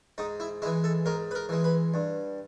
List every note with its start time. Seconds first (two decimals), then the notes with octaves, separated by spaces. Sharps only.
0.18 G#2 D#4
0.40 E4
0.62 G#3 E4
0.66 E3
0.84 A4
1.06 G#2 A#4
1.31 B4
1.35 A#4
1.49 E3 G#3
1.64 B4
1.94 G2